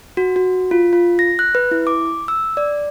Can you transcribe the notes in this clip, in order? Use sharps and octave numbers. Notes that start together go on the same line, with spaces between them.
F#4
F#4
F4
F4
A#6
F#6
B4
E4
D6
E6
D5